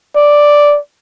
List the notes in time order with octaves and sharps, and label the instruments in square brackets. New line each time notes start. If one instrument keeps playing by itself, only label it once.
[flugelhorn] D5